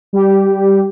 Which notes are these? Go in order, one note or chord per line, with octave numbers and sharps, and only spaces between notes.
G3 G4